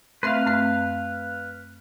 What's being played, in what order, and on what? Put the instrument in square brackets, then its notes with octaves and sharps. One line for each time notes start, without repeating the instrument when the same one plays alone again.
[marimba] A3 C4 E5 [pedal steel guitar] B4 F5
[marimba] F#2 A3 C4